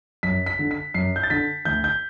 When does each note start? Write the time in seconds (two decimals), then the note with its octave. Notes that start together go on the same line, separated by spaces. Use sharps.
0.23 F#2 B6
0.46 B6
0.59 D3
0.71 B6
0.94 F#2 C7
1.16 G6
1.23 A6
1.30 D3 B6
1.65 D2 G6
1.84 G6